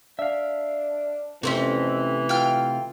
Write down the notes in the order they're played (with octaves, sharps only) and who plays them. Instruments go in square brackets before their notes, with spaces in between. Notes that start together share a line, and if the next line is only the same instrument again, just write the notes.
[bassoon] D4 [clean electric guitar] E5 F5
[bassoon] F2 [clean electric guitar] C3 A3 [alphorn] E3 [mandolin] A#3 C4 C#4
[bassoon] F4 [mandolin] G5 F6